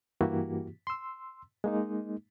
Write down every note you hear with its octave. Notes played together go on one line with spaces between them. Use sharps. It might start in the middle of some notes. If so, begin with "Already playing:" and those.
G2 E3 A#3 E4 F#4 G4
C6 E6
G#3 A#3 D#4